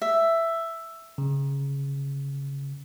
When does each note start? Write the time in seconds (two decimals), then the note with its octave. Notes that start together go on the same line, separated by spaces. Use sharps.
0.02 E5
1.18 C#3